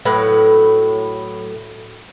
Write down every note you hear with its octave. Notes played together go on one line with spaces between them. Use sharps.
A2 F#3 B4